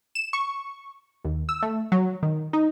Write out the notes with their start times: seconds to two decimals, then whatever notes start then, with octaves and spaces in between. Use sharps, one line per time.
0.15 E7
0.33 C#6
1.24 D#2
1.49 E6
1.62 A3
1.92 F#3
2.23 D#3
2.53 D#4